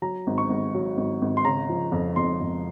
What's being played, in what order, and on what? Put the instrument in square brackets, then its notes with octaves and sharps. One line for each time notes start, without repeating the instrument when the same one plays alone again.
[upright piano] F#3 A#5
G#1
C#6
G#1
F#3
G#1
G#1
C6
C#3 A#5
F3
F2
F2 C6
F2